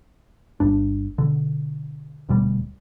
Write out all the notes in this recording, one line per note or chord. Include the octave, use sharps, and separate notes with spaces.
G1 G2 D4
B2 D3
D#1 D2 B2 G3